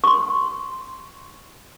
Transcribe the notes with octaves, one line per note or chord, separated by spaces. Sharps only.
C6 C#6